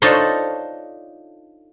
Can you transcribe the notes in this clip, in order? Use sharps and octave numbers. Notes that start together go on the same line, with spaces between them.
D4 D#4 F4 A4 C5 C#5